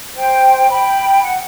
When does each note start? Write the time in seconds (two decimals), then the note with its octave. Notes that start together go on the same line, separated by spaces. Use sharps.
0.16 C5 G5
0.71 G5 B5
1.23 F#5